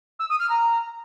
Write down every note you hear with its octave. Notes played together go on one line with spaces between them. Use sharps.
E6
D#6
F6
A#5